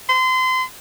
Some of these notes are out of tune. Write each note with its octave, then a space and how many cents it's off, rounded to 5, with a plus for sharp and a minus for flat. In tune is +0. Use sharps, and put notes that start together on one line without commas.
C6 -30